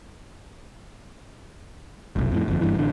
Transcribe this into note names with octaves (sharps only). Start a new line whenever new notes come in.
F1 B1
F2 A2
G1 F2
G1 G2 E3
A1 D3